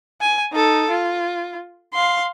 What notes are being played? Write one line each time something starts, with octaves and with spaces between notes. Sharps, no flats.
G#5
D#4 A4
F4
F5 C6